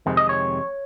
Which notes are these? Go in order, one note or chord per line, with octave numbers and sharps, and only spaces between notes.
F2 C3 D#3 G#3 C4
D#5
C#5